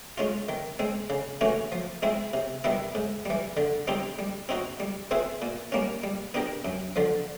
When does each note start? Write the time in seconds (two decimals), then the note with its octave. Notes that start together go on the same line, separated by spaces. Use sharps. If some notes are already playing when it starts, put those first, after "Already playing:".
0.18 G#3 C#4 F4
0.49 D#3
0.79 G#3 C4
1.10 C#3
1.41 E3 A3 C#4 F#4
1.72 F3
2.02 G#3 C4 E4
2.33 C3
2.64 D#3 G3 B3 E4
2.95 G#2
3.25 E3 G3
3.57 D3
3.87 G3 C4 D#4 G4
4.19 G3
4.49 C4 D#4 F#4
4.80 G3
5.11 C4 E4 G#4 B4
5.42 A#2
5.72 G3 A#3 C#4
6.04 G3
6.34 B3 D4 G4 A#4
6.65 F#2
6.96 D3 F3